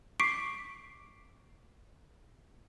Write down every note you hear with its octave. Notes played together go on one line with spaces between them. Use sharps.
C#6 D6 B6 C7 D7